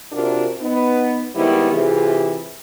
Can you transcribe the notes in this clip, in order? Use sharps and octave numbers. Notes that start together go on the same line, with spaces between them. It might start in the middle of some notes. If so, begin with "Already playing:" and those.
C3 D4 F4 F#4 A#4
B3 D#4
D#3 G3 G#3 B3 C4 E4
C3 E3 F4 G4 G#4